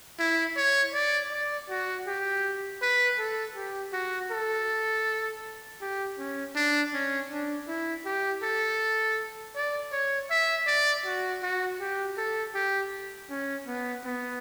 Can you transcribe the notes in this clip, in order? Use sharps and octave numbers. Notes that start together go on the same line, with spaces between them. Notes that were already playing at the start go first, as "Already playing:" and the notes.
E4
C#5
D5
D5
F#4
G4
B4
A4
G4
F#4
A4
G4
C#4
D4
C#4
D4
E4
G4
A4
D5
C#5
E5
D5
F#4
F#4
G4
A4
G4
C#4
B3
B3